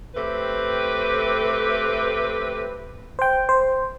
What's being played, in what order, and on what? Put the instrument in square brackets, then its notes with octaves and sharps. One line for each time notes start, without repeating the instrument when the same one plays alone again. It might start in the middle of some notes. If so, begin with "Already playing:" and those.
[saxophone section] A3 C4 G4 B4
[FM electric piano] C5 G5
C5